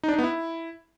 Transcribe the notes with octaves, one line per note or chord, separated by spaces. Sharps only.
D#4
D4
D#4
B3
E4